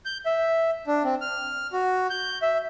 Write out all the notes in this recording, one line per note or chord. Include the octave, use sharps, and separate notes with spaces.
G6
E5
D4
C4
F6
F#4
G6
E5